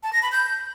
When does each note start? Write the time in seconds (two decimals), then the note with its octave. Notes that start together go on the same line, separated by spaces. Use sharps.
0.03 A5
0.13 A#6
0.22 B5
0.32 G6